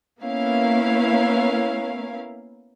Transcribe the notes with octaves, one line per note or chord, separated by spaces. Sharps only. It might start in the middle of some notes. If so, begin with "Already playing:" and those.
A#3 B3 C#4 E4 A#4 F5